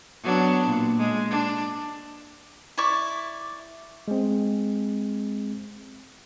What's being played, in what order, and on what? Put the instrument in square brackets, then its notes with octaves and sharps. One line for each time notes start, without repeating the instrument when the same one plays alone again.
[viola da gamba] F#3 B3 D4
A#2
G#3
D4
[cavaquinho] E4 D5 C#6
[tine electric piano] G#3 C4